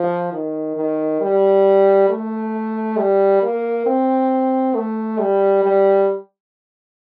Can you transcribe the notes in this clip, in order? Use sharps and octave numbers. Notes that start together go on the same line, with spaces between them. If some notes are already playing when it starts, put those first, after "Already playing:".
Already playing: F3
D#3
D#3
G3
A3
G3
A#3
C4
A3
G3
G3